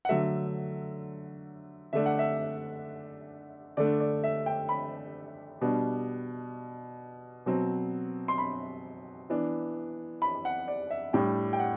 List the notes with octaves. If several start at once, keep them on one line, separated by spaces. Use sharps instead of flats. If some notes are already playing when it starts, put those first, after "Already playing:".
F#5
D3 F#3 A3 E5
D3 A3 D4 E5
F#5
E5
D3 A3 D4 D5
D5
E5
G5
B5
B2 G3 B3 D4
B2 F#3 C4
C6
B5
E3 B3 D4
B5
F#5
D5
E5
A2 G3 D4 G5
G5
F#5